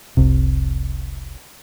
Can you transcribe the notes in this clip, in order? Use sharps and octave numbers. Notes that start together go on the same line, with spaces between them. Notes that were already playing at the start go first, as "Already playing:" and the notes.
F1 C2 C3